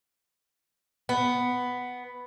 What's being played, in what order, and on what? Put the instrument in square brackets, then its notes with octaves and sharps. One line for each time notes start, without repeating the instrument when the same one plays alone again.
[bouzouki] B3